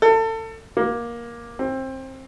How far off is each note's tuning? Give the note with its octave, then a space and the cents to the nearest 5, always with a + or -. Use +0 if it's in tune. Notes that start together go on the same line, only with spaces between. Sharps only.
A4 +30
A#3 +15
C4 +20